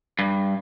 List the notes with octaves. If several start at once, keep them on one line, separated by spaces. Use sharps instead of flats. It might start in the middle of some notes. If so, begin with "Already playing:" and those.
G2